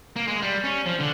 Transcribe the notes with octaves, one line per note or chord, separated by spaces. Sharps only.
A#3
G#3
G3
C#4
F3
D3